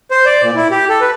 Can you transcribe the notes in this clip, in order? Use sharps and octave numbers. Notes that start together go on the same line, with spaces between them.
C5
D5
A#2
E4
G4
A4
B4